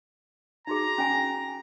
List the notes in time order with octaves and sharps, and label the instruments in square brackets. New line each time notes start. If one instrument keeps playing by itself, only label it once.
[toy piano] D#4 F#4 G#4 [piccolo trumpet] A#5
[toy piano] C#4 G5 G#5